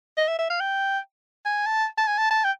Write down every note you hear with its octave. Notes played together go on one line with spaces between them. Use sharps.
D#5
E5
E5
F5
G5
G#5
A5
A5
G#5
A5
A5
G5